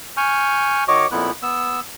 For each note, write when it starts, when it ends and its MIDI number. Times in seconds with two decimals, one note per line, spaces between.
0.17 0.84 80
0.17 0.84 85
0.17 0.84 89
0.17 0.84 91
0.88 1.07 51
0.88 1.07 66
0.88 1.07 73
0.88 1.07 75
0.88 1.07 85
0.88 1.07 86
1.11 1.31 41
1.11 1.31 46
1.11 1.31 59
1.11 1.31 64
1.11 1.31 90
1.43 1.80 59
1.43 1.80 88